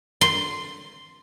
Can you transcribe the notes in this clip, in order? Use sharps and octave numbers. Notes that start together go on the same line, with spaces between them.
C6